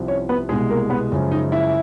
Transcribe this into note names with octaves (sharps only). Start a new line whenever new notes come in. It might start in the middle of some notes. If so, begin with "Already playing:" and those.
Already playing: C2 C3 F3
C#4 C#5
B3 B4
C2 B2 G#3 G#4
A#3 A#4
B3 B4
F#2 C#3 F3 G#3
D#4 D#5
E4 E5